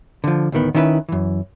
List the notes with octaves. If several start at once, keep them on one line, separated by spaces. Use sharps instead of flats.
D3 F3
D2 A2 D#3 B3
D#3 C#4 E4 F#4 B4
F#2 E3